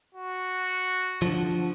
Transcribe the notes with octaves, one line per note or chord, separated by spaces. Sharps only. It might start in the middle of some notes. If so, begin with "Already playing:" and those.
F#4
D3 F3